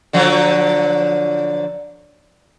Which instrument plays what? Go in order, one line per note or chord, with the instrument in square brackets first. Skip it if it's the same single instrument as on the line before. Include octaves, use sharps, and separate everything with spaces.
[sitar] D3 F3 F#3